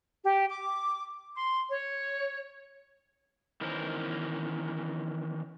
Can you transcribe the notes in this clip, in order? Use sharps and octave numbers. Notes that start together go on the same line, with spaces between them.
G4
D6
C6
C#5
D#3 E3 B3 C#4 A#4 C5